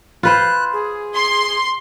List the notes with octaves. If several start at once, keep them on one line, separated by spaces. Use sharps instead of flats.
F4 B4 C5 F#6
G#4
C6